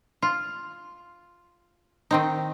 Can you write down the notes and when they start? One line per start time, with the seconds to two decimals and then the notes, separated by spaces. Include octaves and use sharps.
0.22 F4
2.11 D#3 C4 D#4